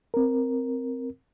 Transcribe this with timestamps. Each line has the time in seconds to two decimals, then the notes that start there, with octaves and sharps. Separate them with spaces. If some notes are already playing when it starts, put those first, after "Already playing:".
0.14 C4 A#4